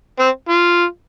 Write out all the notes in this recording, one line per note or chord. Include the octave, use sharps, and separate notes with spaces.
C4
F4